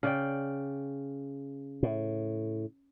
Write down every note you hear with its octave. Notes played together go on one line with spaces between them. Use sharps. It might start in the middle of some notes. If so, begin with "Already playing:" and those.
C#3 D5 G5
A2